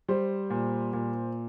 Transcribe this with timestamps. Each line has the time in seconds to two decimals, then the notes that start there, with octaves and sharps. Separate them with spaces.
0.08 G3 C5
0.50 A#2
0.93 A#2